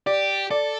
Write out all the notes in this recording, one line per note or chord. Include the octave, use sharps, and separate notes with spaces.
G4 D5
A4 D5